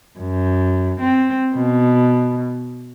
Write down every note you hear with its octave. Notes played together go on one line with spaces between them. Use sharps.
F#2
C4
B2